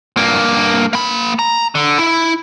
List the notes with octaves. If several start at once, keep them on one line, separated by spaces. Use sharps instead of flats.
G2 A#3
A#3 B5
A#5
D3
E4